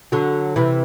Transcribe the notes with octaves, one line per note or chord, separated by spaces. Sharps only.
D3 F#3
C3 E3